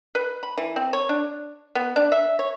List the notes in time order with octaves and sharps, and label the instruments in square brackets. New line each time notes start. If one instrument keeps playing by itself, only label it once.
[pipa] B4
B5
E3
C4
C#5
D4
B3
D4
E5
C#5